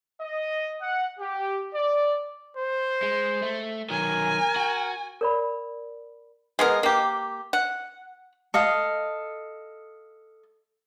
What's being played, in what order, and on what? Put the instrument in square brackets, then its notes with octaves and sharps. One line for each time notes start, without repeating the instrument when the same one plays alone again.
[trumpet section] D#5
F#5
G4
D5
[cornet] C5
[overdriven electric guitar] G#3
A3
[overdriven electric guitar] D#3 F#3 [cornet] A#4 [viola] G#5
[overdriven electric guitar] F#4
[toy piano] A#4 D5 B5
[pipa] G#3 B3 A#4
A#3 G4
F#5
[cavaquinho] A4 D#5 F5